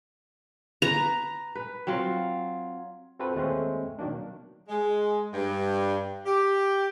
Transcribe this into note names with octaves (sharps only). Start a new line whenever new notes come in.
B4 A#5
B4
F#3 C4 F4
C4 F4 F#4 A4 B4
D#2 G#3 A3 C4 C#4
B2 D#3 F#3 A#3 D4
G#3
G2
G4